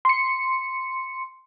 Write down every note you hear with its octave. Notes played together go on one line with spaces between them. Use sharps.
C6 C#7